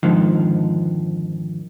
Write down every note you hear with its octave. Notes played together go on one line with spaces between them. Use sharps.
F2 G#2 D3 D#3 F3